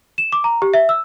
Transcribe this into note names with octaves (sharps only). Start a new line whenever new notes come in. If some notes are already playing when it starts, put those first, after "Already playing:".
E7
D6
A#5
G4
E5
E6